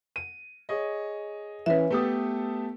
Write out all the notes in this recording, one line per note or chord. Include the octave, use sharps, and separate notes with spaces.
D#7
G#4 C#5 D#5
E3 C#4 B4 E5
A3 B3 G4 A4 D#6